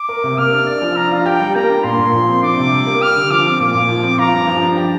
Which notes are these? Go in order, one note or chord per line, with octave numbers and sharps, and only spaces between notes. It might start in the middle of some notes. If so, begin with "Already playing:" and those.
Already playing: D6
A#4
C3
A#3 F6
D4
D5
F3
D4 A#5
F4
G4 G5
G3
A#3 A#5
D4
A#2 C6
A#2
F3
C4
D4 D6
C3
G3
A#3
G4 F6
D3
F3 D6
C4
A#2 D6
A#2
F3
C4
F4 A#5
G2
F3
D4
G4